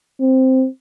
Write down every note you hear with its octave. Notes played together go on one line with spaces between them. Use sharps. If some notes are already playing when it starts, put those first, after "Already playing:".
C4